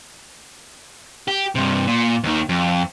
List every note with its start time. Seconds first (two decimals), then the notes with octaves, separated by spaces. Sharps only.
1.28 G4
1.55 G2 C3
1.87 A#2
2.23 D#2 D#3
2.49 F2